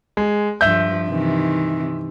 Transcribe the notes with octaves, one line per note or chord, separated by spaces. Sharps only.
G#3
G2 F3 E5 G6
C3 D#3 E3